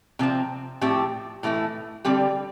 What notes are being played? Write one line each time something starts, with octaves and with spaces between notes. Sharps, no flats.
C3 F3 C4
A2 F3 C4 G4
A2 E3 A3 E4
D3 G3 C4 G4